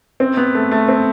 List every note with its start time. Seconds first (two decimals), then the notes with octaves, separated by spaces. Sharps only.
0.20 C4
0.37 B3
0.55 A3
0.71 A3
0.88 C4